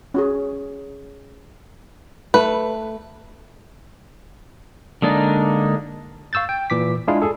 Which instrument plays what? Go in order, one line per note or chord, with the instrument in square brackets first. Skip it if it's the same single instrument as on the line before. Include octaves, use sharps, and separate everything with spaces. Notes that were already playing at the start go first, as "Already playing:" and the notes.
[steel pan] C#4 F#4 G#4
[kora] A3 [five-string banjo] B4
[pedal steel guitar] D3 G#3 A#3 D4 D#4
[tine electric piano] F5 C#6 E6 G6 A6
G5
A#2 E3 D6 B6
G#3 D4 E4 F4 G#4 F5
G#4 A4